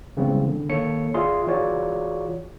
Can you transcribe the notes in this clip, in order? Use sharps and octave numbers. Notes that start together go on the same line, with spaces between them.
C#3 E3 G3 G#3 B3 C4
D3
D#3 A#3 A4 C#5 C#7
F4 G#4 D5 E5 C6
E3 F4 F#4 G#4 C#5 D5